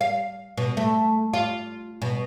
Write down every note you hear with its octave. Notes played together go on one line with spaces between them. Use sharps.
F5
B2
A3
F4
B2